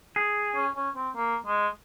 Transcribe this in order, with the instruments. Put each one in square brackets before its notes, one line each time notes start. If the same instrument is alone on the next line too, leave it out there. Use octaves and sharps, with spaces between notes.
[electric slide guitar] G#4
[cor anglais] C#4
C#4
C4
A#3
G#3